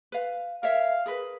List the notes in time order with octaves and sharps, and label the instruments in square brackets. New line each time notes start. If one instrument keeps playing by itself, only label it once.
[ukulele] B4 F5
[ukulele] A#4 C#5 E5 [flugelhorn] F5
[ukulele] G#4 A#4 B4